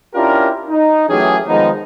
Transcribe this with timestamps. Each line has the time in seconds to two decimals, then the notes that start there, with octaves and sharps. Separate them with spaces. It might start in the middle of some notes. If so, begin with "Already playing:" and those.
0.15 C#4 D4 E4 F4 G4 A#4
0.68 D#4
1.09 E3 F#3 A3 C#4 G4 G#4
1.48 D#3 F3 G#3 B3 D#4